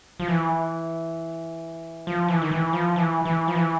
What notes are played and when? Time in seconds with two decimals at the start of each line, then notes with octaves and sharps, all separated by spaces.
0.20 F3
0.28 E3
2.07 F3
2.28 E3
2.42 D#3
2.52 E3
2.73 F3
2.96 E3
3.25 E3
3.48 F3
3.55 E3